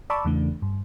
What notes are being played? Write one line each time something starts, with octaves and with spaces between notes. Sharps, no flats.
D5 A5 B5 C#6 D6 E6
E2 C#3 E3 A3 D4
G2